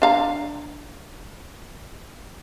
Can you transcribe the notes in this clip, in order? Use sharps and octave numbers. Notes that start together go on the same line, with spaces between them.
D4 F5 A#5